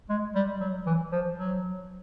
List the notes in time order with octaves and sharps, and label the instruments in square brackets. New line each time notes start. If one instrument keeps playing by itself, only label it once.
[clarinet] G#3
G3
F#3
E3
F3
F#3